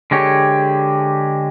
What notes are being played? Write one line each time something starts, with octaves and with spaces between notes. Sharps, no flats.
D3 G#3 G4 C#5